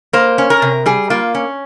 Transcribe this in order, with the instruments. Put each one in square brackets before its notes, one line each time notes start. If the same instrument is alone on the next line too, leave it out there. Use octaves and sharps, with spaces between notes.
[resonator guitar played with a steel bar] A#3 C5
C#4
A#4
C3
G3 G#4
A#3 F4
C#4